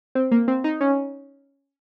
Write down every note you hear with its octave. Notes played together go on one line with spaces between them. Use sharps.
C4
A#3
C4
D#4
C#4